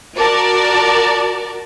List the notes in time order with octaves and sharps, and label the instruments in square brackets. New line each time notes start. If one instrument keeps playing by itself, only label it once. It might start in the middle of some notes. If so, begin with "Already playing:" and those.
[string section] F#4 A#4 D5 A5